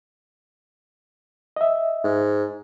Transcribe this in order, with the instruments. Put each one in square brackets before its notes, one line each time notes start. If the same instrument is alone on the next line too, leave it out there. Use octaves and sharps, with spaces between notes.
[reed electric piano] D#5 E5
[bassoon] G#2